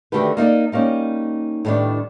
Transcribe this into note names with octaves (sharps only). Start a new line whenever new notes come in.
D3 D#3 A3 F#4 G4 B4
A#3 D#4 D5 D#5
G3 A#3 C#4 D#4
A2 D#3 G3 B3 D4